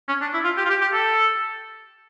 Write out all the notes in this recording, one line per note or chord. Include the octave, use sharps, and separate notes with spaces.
C#4
D4
E4
F4
G4
F4
G4
G4
A4